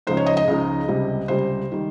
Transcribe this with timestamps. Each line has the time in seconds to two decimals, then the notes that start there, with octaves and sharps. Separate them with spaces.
0.07 C#2 C#3 F3 G#3 D#4 C5
0.17 C#5
0.26 D#5
0.37 D#5
0.48 C#2 C#3 F3 G#3 D#4
0.88 C#2 C3 G3
1.28 C#2 C3 G3 C5
1.72 D#3 G3